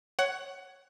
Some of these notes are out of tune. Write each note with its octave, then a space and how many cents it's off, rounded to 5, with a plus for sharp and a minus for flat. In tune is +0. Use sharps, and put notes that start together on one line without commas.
C#5 +0 F#5 +20